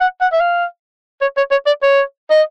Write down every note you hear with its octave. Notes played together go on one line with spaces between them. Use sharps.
F#5
F#5
E5
F5
C#5
C#5
C#5
D5
C#5
D#5